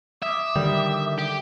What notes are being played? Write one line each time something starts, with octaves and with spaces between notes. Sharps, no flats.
E5 D6 D#6
D3 D#3 G3
G4